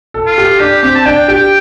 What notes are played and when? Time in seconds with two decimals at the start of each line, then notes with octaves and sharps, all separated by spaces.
0.14 A4
0.26 F4
0.38 G4
0.59 D4 G4
0.83 C4 G4
0.95 A5
1.06 D4 G5
1.28 G4 G5